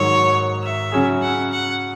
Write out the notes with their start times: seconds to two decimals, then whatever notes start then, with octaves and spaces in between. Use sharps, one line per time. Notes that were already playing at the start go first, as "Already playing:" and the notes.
Already playing: G#2 D#3 F#3 C#5
0.63 E5
0.92 C#3 F#3 C#4 G#4
1.22 F#5
1.51 F#5